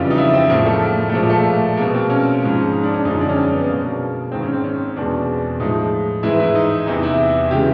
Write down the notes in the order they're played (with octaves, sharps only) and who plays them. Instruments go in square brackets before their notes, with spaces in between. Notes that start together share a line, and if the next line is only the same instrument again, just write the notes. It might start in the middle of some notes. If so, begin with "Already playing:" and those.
Already playing: [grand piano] F2 C#3 E3 G3 F4
D#4
E4
C4
A2 F3 G#3 A#3
A3
A#3
A3
A#2 F3 G#3 A#3
A3
B2 G#3 A#3
C4
C#4
G#2 F3 G#3
D#4
D4
C#4
F#2 D3 F3 G#3 D#4
D4
C#4
C4
B3
B2 G#3 A#3
G#2 D#3 G#3 C4
C#4
C4
C#4
E2 B2 G#3 D4
A2 F3 G#3 D#4
G#2 E3 G#3 E4
E4
D#4
E2 C3 E3 D#4
E4
C#3 E3 G#3 G4